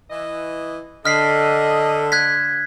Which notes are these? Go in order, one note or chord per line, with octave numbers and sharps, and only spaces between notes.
E3 D#5
D3 A4 D#5 F6 B6 C7
F#6 G#6 B6